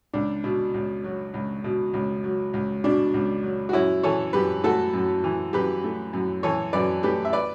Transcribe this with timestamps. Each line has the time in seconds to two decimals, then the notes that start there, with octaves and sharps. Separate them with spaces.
0.14 C#2 D4
0.44 B2
0.74 C#2
1.04 F#3
1.34 C#2
1.64 B2
1.94 C#2
2.24 F#3
2.54 C#2
2.84 B2 D4
3.14 C#2
3.43 F#3
3.69 F#4
3.73 F#2 C#4 E4
4.03 E3 A4 C#5
4.33 F#2 G4 B4
4.64 A3 F#4 A4
4.93 F#2
5.24 E3
5.53 F#2 G4 B4
5.84 A3
6.13 F#2
6.43 E3 A4 C#5
6.73 F#2 B4 D5
7.03 A3 G4 B4
7.25 E5
7.33 B4 D5